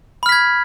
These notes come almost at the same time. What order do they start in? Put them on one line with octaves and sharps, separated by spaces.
B5 F6 B6 G#6